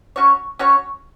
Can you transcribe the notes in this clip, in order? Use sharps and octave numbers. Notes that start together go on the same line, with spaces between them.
C#4 F#4 C#5
C#4 F#4 C#5